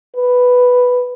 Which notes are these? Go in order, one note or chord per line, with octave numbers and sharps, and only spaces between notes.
B4